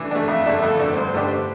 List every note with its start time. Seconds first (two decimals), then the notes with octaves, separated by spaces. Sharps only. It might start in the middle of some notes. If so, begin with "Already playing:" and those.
Already playing: E3 A3 D4
0.11 A3 D4
0.28 F2 E5
0.46 D3 A3 D4
0.62 F2 A4
0.79 D3 A3 D4
0.96 G2 C5
1.14 D3 A3 D4 G4